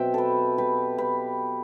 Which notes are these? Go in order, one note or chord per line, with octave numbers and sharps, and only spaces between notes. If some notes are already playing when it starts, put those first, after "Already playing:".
Already playing: B2 F#3 C4 E5 G5
G4 A4 B4
G4 B4
G4 B4